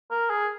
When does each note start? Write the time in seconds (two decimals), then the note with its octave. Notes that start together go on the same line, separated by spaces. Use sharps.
0.11 A#4
0.30 G#4